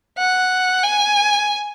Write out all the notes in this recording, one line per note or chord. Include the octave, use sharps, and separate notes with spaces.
F#5
G#5